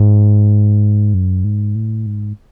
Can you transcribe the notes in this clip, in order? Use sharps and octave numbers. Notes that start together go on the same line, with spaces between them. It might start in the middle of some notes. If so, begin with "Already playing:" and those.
Already playing: G#2
F#2
G#2
A2
G#2